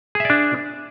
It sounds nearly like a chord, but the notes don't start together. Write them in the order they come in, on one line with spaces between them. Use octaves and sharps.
G#4 E5 D5 D4